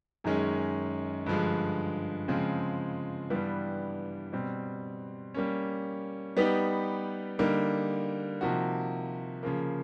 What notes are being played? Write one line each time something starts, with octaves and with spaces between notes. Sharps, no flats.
F#2 D#3 G#3 C#4
G2 D3 F3 G#3
C#3 F3 G#3 C4 F4
G2 E3 G3 B3 D4
B2 G3 C4
G3 A#3 C#4
G3 B3 D#4 G4 B4
D3 G3 A#3 D#4
C3 F3 A#3 D#4 F#4
C#3 F3 A#3